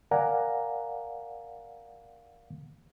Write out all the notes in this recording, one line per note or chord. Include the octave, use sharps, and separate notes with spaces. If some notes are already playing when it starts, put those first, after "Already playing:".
A#4 D5 F5 F#5 G#5 A#5